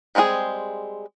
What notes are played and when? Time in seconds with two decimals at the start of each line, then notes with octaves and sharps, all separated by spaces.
0.15 G3 G#3 C4 F4 G#4